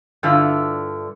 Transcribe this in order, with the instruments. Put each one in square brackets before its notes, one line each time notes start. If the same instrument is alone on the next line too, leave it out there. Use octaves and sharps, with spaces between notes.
[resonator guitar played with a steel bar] G2 D3 E4 F4